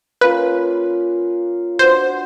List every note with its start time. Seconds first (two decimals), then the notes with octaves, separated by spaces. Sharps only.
0.21 A#3 C#4 F4 B4
1.79 D4 F#4 B4 C5